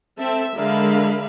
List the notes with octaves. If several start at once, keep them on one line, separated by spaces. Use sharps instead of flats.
C4 A4 E5
D3 G#3 A#4 E5 F5 B5